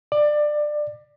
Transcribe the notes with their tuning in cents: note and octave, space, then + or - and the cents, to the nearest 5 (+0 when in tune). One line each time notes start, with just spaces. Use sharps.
D5 +20